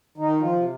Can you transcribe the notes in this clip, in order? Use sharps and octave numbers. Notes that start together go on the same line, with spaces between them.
D#3 D#4
F3 F4
C3